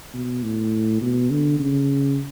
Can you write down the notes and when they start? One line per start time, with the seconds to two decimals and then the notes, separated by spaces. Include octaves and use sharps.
0.14 B2
0.43 A2
1.01 B2
1.30 D3
1.59 C#3